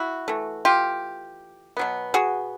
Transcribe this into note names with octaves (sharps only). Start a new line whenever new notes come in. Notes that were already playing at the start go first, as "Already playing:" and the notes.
Already playing: E4 F#4
E3 A3
F4 G4
B2 F#3 B3
F#4 G#4